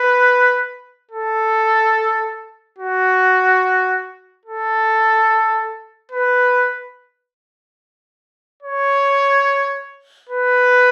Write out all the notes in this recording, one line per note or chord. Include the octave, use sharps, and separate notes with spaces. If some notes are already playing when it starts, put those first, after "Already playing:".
Already playing: B4
A4
F#4
A4
B4
C#5
B4